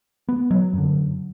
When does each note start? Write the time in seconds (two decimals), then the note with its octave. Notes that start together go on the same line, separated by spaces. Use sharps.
0.29 B3
0.51 F#3
0.73 F#2 D3